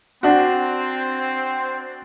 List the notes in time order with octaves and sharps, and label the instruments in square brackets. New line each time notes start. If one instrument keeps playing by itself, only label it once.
[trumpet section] C4 [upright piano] D4 F#4